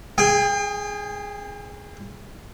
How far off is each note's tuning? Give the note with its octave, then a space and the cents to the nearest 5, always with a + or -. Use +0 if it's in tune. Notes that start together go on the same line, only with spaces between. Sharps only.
G#4 +0 G5 +40